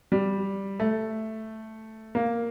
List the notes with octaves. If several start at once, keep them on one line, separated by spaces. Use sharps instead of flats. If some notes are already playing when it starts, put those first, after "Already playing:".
G3
A3
A#3